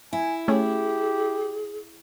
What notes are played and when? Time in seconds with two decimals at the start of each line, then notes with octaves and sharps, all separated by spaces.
0.13 E4 G#5
0.48 A3 C#4 G4 G#4